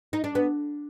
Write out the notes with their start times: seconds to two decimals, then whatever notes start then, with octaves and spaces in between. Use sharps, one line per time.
0.13 D#4
0.24 D4
0.35 B3